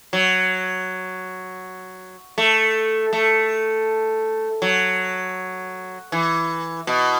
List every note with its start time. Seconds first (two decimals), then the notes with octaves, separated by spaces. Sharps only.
0.13 F#3
2.38 A3
3.13 A3
4.62 F#3
6.12 E3
6.87 B2